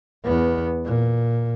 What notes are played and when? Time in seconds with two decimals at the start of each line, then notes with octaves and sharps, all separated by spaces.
0.24 E2 B3
0.85 A#2